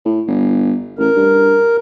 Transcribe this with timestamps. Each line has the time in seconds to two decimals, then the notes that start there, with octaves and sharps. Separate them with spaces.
0.05 A2
0.27 G1
0.99 A1 A#4
1.16 G2